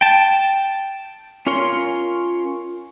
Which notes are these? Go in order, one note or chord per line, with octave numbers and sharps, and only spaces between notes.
G5 A5
C#4 F4 A#4 C#5 C6